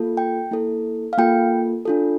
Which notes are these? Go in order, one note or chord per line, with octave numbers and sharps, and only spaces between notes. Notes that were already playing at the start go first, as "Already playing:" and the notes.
Already playing: A#3 F4 A4
G5
A#3 E4 A4
F5
A#3 F4 A4 G5
D4 F4 A4